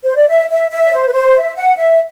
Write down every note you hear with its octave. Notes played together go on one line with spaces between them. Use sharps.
C5
D5
E5
E5
E5
D5
C5
B4
C5
E5
F#5
E5